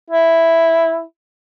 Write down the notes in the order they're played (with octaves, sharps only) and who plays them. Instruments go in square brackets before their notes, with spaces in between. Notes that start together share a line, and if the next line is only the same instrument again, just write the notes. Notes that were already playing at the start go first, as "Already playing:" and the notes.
[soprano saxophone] E4